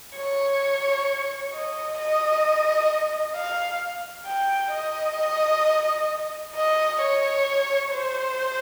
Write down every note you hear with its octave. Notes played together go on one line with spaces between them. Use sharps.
C#5
D#5
D#5
F5
G5
D#5
D#5
C#5
C5